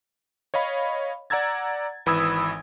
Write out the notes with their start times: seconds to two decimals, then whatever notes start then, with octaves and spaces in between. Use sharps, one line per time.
0.54 C#5 D#5 F5 B5
1.30 D5 F#5 A#5 E6 G#6 A6
2.06 G#1 E3 B5 D#6 E6 G#6